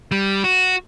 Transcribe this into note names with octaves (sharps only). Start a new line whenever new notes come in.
G3
F#4